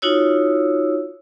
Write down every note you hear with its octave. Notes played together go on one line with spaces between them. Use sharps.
D#4 F4 F#4 C#5 E6